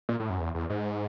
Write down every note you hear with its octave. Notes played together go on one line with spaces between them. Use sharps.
A#2
A2
F#2
E2
E2
G#2